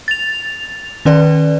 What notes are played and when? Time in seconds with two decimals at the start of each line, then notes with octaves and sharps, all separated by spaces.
0.08 A6 F7
1.05 D#3 C#4 B4 D5